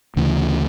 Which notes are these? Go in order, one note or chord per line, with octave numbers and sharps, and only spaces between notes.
D2 C#3 E3 A3